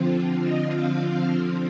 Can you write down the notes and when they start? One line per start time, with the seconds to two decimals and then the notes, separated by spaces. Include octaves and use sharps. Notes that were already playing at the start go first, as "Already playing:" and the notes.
Already playing: D3 F3 C4 F4
0.43 D#5
0.72 F5